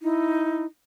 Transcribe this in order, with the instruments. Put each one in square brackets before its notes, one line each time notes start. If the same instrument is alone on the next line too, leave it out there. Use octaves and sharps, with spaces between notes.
[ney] D#4 [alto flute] E4